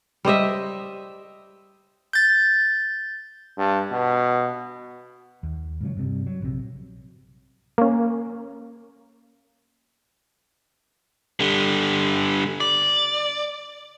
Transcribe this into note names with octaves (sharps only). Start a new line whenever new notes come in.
G3 C5 D#5 E5
G6 A6
G2
B2
D#2
G#2 C#3 F#3
G2 C3 G3
F#3
A#1 C3
A#3 C#4
D3 G3
D5